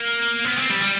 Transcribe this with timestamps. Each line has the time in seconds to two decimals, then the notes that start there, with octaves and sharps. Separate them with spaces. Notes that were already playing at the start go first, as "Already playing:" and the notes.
Already playing: A#3
0.45 B3
0.57 C4
0.70 G3
0.82 G3